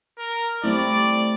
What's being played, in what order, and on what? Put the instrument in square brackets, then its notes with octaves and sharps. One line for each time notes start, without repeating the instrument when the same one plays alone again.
[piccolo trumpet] A#4
[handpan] G3 C4 E4 [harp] A3 [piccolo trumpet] D5